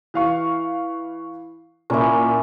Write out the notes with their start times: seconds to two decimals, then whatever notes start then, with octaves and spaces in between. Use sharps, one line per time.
0.14 E3 F5 C#6
1.90 A#2 C#4 E4 A#4